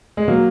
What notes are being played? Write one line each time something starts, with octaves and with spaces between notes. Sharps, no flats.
G#3
F#3 A#3